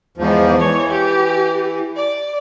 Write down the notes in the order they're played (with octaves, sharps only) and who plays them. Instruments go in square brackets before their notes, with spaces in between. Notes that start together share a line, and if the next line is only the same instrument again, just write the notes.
[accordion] E2 G#2 F3
[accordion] E3 [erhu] C#5
[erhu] G4
D5